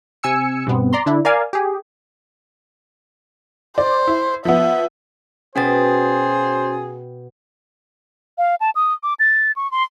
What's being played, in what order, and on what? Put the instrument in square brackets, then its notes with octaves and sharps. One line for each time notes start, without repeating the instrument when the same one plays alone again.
[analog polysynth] C3 G#5 E6 C#7
G2 B2 B3 C4
D5 A#5 C6
D3 D4 E4
A#4 D5 F5 G#5
G4 G#4
[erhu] C5 [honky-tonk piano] D5
[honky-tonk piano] E4
[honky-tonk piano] F3 B3 [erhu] E5
[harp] B2 G5 [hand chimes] C#4 F#4 A6 [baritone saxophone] G#4 [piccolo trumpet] C5
[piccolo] F5
A5
D#6
D6
A6
C#6
C6